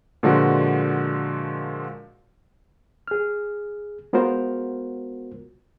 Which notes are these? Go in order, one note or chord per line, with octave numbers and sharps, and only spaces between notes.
A#2 D3 F3 G#3 F#4 A#4
G#4 F6
G#3 B3 F4 F#4 A#4 C5